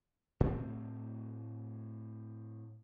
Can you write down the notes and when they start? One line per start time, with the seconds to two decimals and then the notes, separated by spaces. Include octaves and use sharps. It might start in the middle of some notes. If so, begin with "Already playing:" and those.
0.40 A2 A3 C4